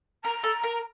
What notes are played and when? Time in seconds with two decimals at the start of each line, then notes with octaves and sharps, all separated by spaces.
0.24 A#4 A#5
0.44 A4
0.63 A#4